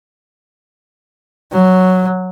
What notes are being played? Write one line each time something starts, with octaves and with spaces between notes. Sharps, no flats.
F#3